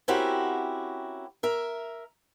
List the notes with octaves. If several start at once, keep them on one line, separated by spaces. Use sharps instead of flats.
C4 C#4 E4 F#4 G4 A#4
A#4 E5